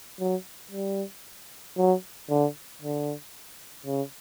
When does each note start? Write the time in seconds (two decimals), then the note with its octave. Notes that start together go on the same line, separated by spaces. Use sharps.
0.19 F#3
0.71 G3
1.77 F#3
2.29 D3
2.82 D3
3.86 C#3